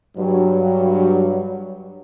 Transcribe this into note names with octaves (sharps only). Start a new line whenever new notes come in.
G2 F#3